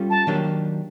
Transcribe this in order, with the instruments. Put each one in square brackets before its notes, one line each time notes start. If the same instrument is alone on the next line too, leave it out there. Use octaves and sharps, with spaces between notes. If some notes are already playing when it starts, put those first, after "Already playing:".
Already playing: [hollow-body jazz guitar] G3 C#4 F4 A4
[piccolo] A5
[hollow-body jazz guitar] D#3 F#3 A#3 D4 G4